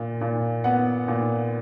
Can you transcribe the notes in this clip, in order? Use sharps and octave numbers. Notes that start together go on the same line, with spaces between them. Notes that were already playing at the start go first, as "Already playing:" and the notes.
Already playing: A#2
A#2
B3 F#5
A#2